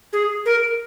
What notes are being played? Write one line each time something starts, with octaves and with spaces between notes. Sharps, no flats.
G#4
A#4